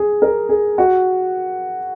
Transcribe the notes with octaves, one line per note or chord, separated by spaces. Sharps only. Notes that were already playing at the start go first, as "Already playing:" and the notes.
Already playing: G#4
A#4
G#4
F#4